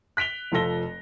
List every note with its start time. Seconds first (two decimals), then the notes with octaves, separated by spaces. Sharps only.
0.17 F#6 B6 D7 F7 G7
0.52 F1 F3 F4 A4 A#6 G7